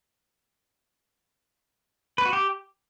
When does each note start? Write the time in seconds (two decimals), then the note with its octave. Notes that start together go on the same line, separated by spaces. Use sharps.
2.18 B4
2.26 F#4
2.33 G4